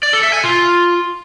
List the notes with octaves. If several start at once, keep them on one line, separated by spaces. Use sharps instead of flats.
D5
A4
E5
G#5
F4